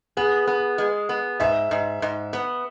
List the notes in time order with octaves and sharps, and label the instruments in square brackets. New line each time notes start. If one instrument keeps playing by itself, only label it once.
[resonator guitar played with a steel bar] B3 [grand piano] G#4
[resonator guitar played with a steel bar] B3
G#3
B3
[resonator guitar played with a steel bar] G#2 [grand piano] E5
[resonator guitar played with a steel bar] G#2
G#2
B3